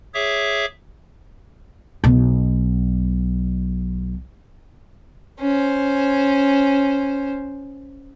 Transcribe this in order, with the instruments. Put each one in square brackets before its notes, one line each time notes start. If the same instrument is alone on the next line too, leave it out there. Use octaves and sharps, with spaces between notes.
[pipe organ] G#4 C#5 E5 D6
[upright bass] B1 B2
[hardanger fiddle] C#4 C5